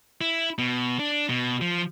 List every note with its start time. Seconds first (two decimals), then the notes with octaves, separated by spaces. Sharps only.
0.21 E4
0.58 B2
0.99 D4
1.29 B2
1.61 F3